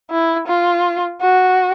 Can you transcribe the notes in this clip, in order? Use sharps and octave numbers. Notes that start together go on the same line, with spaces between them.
E4
F4
F#4